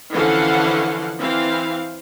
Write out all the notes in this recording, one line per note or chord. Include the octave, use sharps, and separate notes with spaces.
D3 E3 F3 C#4 F5 F#5
E3 C4 F5